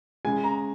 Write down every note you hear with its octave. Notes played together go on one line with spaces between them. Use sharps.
C#3 G#3 G#5
A#5